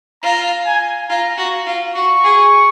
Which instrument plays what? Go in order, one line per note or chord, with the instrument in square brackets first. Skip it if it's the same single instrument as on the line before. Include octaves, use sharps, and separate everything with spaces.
[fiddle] F4 [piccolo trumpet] A#5
[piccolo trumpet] G#5
[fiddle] F4 [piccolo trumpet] A#5
[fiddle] F#4
F4
[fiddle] F#4 [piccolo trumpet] C#6
[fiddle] G#4